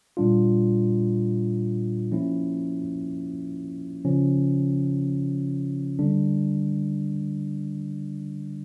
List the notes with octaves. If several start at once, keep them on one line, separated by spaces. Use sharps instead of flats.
A#2 G3 D4 F4
F3 A#3 C#4 E4
C#3 F3 C#4
D3 G3 D4